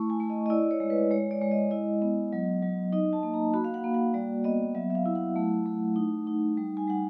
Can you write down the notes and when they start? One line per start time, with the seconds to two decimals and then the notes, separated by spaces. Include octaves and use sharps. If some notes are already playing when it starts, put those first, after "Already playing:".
Already playing: A3 E4 C#6
0.10 G#5
0.20 A3
0.30 D#5
0.46 D#5
0.50 E4 D5
0.71 C#5
0.80 G#3
0.90 B4
1.11 G#3 C#5
1.31 D5
1.42 G#3
1.51 D#5
1.71 E4 D#5
2.02 B3
2.33 F#3
2.62 F#3
2.92 D#4 D#5
3.13 A5
3.23 A#3
3.34 A#5
3.54 F#4 B5
3.64 F5
3.74 F#5
3.84 A#3
3.94 F#5
4.14 G3 D5
4.44 B3 D#5
4.75 F#3 E5
4.90 E5
4.95 F5
5.06 E4
5.15 F#5
5.36 A3
5.66 A3
5.96 D#4
6.27 D#4
6.57 G3
6.77 G#5
6.87 G3 F#5